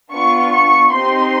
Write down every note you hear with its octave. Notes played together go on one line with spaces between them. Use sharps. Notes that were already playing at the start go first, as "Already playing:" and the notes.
B3 D4 F4 C#6
C#6
C4 D#4 G4 C6